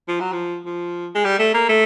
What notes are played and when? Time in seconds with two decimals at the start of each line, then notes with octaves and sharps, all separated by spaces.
0.08 F3
0.20 F#3
0.32 F3
0.66 F3
1.15 G#3
1.25 G3
1.39 A3
1.54 A#3
1.69 A3